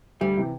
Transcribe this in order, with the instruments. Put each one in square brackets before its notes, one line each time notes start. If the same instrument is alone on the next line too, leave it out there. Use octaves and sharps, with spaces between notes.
[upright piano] D2 [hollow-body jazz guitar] G3
[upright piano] C3 E3